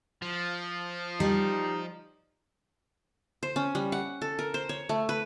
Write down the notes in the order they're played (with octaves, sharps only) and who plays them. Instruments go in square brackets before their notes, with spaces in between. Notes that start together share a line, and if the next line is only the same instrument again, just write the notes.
[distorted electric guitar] F3
[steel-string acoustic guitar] G3 [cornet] D#4
[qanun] C5
C#4
G3
F#5
A4
A#4
C5
C#5
A3
B4